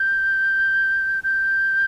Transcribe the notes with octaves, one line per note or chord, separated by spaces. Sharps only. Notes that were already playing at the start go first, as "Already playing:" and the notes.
Already playing: G6
G6